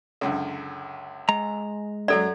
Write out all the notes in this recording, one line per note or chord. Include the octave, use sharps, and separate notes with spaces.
C#2 F#2 D3
G#3 A#5
F#2 F#3 A4 D5